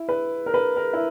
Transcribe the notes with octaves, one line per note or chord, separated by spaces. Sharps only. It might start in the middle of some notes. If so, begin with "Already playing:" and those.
Already playing: E4
B4
A#4
B4
A#4
E4